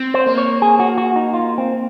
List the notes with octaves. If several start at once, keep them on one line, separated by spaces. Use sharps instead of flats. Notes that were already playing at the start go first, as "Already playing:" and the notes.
Already playing: C4
C5
A#3
C#5
G#4
F#4
F#4
D#4
F4
C4